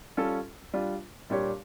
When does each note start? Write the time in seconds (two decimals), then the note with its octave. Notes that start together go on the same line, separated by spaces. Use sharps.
0.17 G3 C#4 F4 A4
0.74 G3 D4 F4
1.30 A#2 G3 D4 G4 C#5